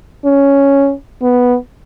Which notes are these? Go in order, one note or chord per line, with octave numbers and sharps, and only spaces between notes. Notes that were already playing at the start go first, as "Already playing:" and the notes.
C#4
B3